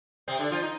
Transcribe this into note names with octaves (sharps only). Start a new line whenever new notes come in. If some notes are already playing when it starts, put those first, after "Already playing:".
C3 C4
D3 D4
F3 F4
D#4